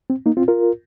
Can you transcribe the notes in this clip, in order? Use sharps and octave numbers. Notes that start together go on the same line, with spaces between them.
C4
A#3 D#4
C4 F4
F4 A#4